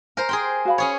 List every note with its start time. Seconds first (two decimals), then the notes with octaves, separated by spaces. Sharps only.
0.17 A#4 C5 G#5 A#5
0.29 G#4 C5 G5
0.65 F#4 F5 B5
0.78 C#4 G#4 C#5